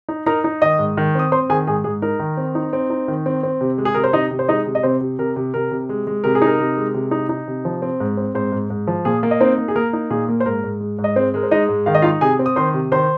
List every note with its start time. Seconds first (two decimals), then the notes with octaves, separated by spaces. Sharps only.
0.09 D#4
0.26 D#4 A#4 A#5
0.44 D#4
0.62 D#3 D#5 D#6
0.79 G#2
0.97 D#3
1.15 C4 D#6
1.32 C4 C5 C6
1.50 D#3 G#4 G#5
1.67 G#2 G#4 G#5
1.84 G#2 G#4
2.02 D#4 A#4
2.20 D#3
2.37 C4
2.55 D#4
2.73 C4
2.90 D#4
3.08 D#3
3.26 C4
3.43 C4
3.61 C3
3.78 G#3
3.85 G#4
3.94 C3 A#4
4.04 C5
4.13 C3 D#4 D#5
4.31 C3
4.39 C5
4.48 G#3 D#4 D#5
4.66 C3
4.75 D#5
4.83 C3 C4 C5
5.01 C3
5.19 C3 A#4
5.36 C3
5.54 C3 A#4
5.71 C3
5.89 G#3
6.07 G#3
6.24 C3 A#4
6.35 G#4
6.42 D#4 A#4
6.60 C3
6.77 G#3
6.94 C3
7.11 D#4
7.29 D#4
7.48 C3
7.65 F3
7.82 C4
8.00 G#2
8.17 C4
8.34 G#2 C4 C5
8.52 G#2
8.70 G#2
8.87 F3
9.05 A#2 G#4
9.23 A#3
9.31 D#5
9.40 C4 D#4 C5
9.58 A#3
9.68 G#4
9.76 A#3 A#4
9.93 D#4
10.10 A#2 G#4
10.29 A#3
10.40 C5
10.46 G#2 A#4
10.64 G#2
10.80 G#3
10.98 G#2
11.04 D#5
11.16 G#3 C4 C5
11.34 G#3 A#4
11.43 C5
11.51 G#3 D#4 D#5
11.69 G#2
11.86 D#3 F5
11.95 D#5
12.02 D#4 F4 F5
12.21 C3 G#4 G#5
12.39 C4
12.46 D#6
12.56 D#3 C5 C6
12.74 C3
12.92 D#3 C5 C6